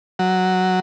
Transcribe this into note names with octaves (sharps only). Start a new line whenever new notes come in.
F#3